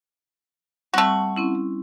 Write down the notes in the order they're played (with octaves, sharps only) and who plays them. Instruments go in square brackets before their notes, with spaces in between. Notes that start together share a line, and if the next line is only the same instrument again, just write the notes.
[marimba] G3 C4 [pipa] A3 F#4
[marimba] C4 C#4 E4